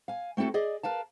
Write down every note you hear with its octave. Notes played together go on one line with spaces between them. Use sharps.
F5 G#5
A3 C4 E4 F#4 A4
G#4 D5 D#5
A#4 B4 F5 A5